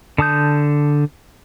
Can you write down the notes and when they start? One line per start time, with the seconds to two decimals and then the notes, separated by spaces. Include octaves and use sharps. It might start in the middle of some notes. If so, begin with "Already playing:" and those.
0.18 D3 A5 D#6 G6